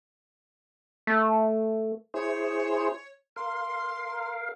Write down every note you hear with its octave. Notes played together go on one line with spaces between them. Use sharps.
A3
E4 G#4 C5 C#5
A#4 F5 C6